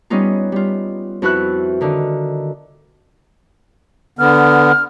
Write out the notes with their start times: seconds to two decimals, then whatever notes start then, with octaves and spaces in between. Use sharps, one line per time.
0.10 G3 B3 C#4 D#4 F4
0.52 G3 F4
1.22 F2 E4 F#4 B4 E5 F#6
1.81 D3 D#3
4.19 D3 B3 F6